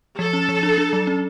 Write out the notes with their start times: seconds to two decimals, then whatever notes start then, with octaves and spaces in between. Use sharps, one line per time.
0.19 F3 A4
0.33 C#4
0.49 F3
0.63 D4
0.78 D4
0.93 F#3
1.07 C#4